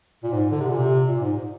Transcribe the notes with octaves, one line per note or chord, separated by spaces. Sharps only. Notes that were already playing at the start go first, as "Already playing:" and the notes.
A#2
G#2
D3
C3
A#2
C3
A#2
G#2